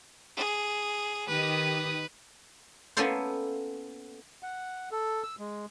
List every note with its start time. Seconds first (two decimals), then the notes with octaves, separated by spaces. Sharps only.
0.36 G#4
1.28 D#3 G4 B4 D#6
2.97 A#3 B3 C#4 E4 A4 C5
4.43 F#5
4.91 A4
5.23 E6
5.39 G#3